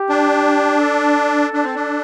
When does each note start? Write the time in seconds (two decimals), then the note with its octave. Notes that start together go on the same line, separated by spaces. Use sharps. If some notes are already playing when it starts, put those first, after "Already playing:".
Already playing: G4
0.09 D4
0.81 A4
1.53 D4
1.64 C4
1.75 D4